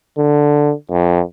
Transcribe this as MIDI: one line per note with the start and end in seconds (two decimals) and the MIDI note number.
0.18 0.74 50
0.91 1.21 41